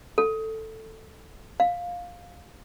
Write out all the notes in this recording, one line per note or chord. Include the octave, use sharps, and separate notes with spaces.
A4
F5